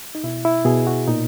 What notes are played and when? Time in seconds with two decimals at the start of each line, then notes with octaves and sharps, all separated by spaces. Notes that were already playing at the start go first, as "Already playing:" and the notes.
0.15 D#4
0.24 B2 E4
0.45 E4
0.65 B2 G#4
0.87 F#4
1.08 A#2 D#4